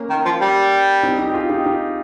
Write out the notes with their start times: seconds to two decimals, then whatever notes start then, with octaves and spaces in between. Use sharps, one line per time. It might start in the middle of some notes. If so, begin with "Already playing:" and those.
Already playing: A#3 C#4
0.10 D#3
0.25 F3
0.41 G3
1.03 C4 D#4
1.18 D#4 G4
1.29 G4
1.34 F4 G#4
1.50 D#4 G4
1.66 D#4 G4